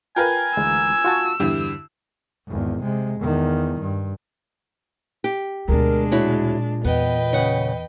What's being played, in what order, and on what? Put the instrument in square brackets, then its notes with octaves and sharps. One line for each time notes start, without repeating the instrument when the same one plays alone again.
[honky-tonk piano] F4 A#4 B4 [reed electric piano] G5 [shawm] G#5
[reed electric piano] D2 E3 G#3 [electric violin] E6
[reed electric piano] F4 F#4 A5 [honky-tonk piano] C#6
[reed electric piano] E2 G2 [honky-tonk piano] D3 E4 G4
[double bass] G#1 E2
C3 G#3
E2 D#3
G2
[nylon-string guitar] G4
[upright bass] D2 B2 [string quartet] G#3 D4 [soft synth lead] A#4
[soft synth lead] A#2 [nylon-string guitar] E4 F#4 C#5
[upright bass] E2 [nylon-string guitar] B3 [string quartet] B4 D#5 G5
[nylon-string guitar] C#3 F#5